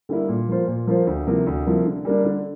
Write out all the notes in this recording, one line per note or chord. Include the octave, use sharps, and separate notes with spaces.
D3 G3 A#3 E4
A#2
F3 A#3 F4 C5
A#2
F3 A#3 F4 C5
D2
C3 F3 A#3 E4
D2
C3 F3 A#3 E4
D3
G3 A#3 D4
D3